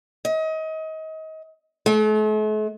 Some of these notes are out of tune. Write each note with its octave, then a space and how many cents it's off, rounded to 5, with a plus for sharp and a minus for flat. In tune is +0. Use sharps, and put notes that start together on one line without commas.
D#5 +30
A3 -45